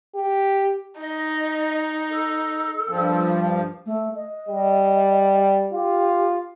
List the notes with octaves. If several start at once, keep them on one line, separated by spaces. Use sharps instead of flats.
G4
D#4 D#5
A4
G2 F3
A3
D#5
G3
F4 G4